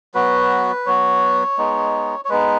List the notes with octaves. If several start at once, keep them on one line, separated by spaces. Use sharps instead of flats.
F#3 B3 F#4 B4
F#3 B3 F#4 C#5
G#3 B3 D#4
C#5
G#3 B3 D#4 B4